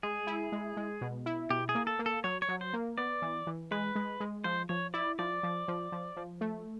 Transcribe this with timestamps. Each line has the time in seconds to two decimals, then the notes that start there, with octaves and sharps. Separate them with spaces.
0.03 G#3 G#4
0.27 E4
0.52 G#3
0.77 G#3
1.01 B2
1.26 E4
1.50 B2 G4
1.69 G#4
1.75 A#3
1.87 A4
1.99 A#3
2.06 A4
2.24 F#3 C#5
2.42 C#5
2.49 F#3
2.61 C5
2.73 A#3
2.98 B3 D5
3.22 E3
3.47 E3
3.71 G#3 B4
3.96 G#3
4.20 G#3
4.44 F3 C5
4.69 F3 C#5
4.94 E4 D5
5.19 F3 D5
5.43 F3
5.68 F3
5.92 F3
6.17 F3
6.41 A3